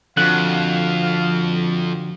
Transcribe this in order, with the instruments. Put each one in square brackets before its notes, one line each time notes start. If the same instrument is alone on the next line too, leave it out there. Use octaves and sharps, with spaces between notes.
[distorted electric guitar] F2 [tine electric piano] D3 F3 F#4 [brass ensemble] F5 [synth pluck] F#6